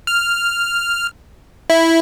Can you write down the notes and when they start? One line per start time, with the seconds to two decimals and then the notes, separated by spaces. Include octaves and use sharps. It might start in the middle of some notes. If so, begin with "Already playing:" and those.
0.07 F6
1.70 E4